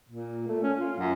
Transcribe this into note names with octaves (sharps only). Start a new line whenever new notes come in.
A#2
A3
C#4
F4
F#2